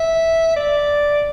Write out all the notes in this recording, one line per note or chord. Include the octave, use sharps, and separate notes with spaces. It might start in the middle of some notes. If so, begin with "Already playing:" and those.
Already playing: E5
D5